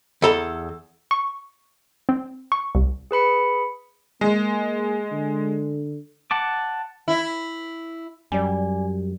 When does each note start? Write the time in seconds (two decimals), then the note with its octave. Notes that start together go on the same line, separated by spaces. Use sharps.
0.22 E2 A4 A#5
1.11 C#6
2.09 C4
2.52 C#6
2.75 C2
3.11 G#4 B4 B5 C#7
4.21 G#3 A#3
5.11 D3
6.31 F#5 A5 D6
7.08 E4
8.32 F#2 G3 D5 G#5